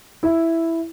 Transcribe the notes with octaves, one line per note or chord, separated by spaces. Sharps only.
E4